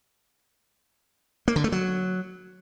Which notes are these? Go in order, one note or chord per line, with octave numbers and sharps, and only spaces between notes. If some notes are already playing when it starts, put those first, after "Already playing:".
A#3
D3
A3
F#3